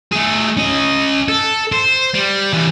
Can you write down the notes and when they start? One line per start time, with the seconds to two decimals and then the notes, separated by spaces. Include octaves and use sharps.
0.12 A3 G#4
0.57 C#4 D#5
1.29 A4
1.72 C5
2.15 G3
2.53 E3 G3